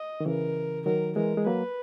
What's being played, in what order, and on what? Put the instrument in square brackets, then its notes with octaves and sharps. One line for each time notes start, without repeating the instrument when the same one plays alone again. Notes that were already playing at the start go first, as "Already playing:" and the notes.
Already playing: [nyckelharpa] D#5
[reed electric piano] D#3
[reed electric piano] C#3 E3 [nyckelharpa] A#4
[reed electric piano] D#3 F#3 [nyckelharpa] A#4
[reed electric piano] E3 G#3 [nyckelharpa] A#4
[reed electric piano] G#3
[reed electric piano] F#3 A#3 [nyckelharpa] B4